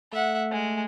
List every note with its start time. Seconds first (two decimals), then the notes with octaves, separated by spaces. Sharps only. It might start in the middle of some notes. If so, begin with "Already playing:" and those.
0.13 A3 E5 F#5
0.51 G#3